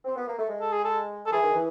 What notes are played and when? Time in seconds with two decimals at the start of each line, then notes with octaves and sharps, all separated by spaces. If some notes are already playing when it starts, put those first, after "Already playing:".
0.04 C4
0.16 B3
0.27 A#3
0.38 A3
0.49 G#3
0.61 A4
0.73 G#4
0.84 A4
1.26 A4
1.32 E3 G#4
1.43 D#3
1.53 E3